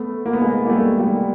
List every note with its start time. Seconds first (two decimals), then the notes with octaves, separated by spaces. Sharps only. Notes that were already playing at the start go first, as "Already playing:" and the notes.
Already playing: A3 B3
0.26 A#3
0.33 B3
0.41 G#3 A#3
0.65 A#3
0.69 G3 A3
0.98 G3 A3